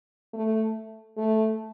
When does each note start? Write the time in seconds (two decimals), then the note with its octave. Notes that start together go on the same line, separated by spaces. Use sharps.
0.34 A3
1.17 A3